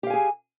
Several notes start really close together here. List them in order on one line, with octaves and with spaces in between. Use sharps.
G4 F5 G#5 G#4